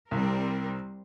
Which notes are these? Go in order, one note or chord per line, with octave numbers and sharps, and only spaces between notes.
C2 G3 C4 A#4